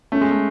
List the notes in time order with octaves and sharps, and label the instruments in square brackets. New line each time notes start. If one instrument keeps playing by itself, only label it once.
[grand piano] A3 [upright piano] C#4
[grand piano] G#3
A3